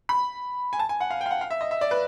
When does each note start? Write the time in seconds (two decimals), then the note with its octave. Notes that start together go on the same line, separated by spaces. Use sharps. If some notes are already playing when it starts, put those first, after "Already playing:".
0.09 B5
0.73 G#5
0.79 A5
0.89 G#5
1.00 F#5
1.10 F5
1.21 G5
1.26 F5
1.31 F#5
1.41 F5
1.50 E5
1.61 D#5
1.71 E5
1.81 D5
1.91 B4